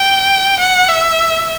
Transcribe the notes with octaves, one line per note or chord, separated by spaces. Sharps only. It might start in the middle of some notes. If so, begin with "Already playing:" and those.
Already playing: G5
F#5
E5